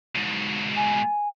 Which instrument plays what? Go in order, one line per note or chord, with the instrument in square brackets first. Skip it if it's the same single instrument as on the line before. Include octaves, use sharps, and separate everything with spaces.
[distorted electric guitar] G#2 B2
[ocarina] G#5